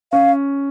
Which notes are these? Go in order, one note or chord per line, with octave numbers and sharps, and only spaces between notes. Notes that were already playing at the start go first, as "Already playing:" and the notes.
C#4 F5